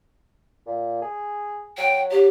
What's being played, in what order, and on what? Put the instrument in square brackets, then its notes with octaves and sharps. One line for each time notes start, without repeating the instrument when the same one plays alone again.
[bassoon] A#2
G#4
[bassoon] F#3 [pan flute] G5
[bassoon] F#3 [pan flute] G4